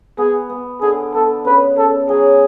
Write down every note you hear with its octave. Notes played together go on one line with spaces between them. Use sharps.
B3 G#4
B3
D3 G#4
B3 A4
C#3 B4
C#3 A4
F#3 G#4